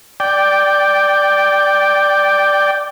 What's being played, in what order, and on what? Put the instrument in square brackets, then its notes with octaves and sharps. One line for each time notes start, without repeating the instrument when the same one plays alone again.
[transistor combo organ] D5 G5